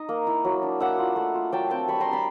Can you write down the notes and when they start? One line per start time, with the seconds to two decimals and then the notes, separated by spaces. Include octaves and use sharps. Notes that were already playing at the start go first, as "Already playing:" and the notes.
Already playing: D#4 D#5
0.09 A#3
0.27 E4
0.44 F#3
0.63 D4
0.80 A#3 E5 F#5
0.99 F4
1.16 A3
1.35 F4
1.52 F#3 G5 A5
1.70 C4 G5 A5
1.88 G3 B5 C#6
2.00 A#5 C6
2.06 D4
2.12 A5 B5